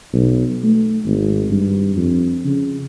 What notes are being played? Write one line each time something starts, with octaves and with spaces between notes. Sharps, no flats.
B1
A3
G#1
G2
F2
C#3